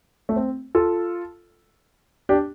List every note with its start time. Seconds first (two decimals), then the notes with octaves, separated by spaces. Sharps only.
0.29 A3
0.36 C4
0.75 F4 A4
2.29 D4 G4